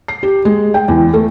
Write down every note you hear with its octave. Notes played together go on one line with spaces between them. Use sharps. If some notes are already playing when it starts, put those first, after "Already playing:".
C7
G4
G#3
G5
E2
A3